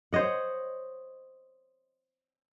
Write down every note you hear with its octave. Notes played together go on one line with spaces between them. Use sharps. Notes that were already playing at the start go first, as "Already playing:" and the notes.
C5 C#5 D#5 F#5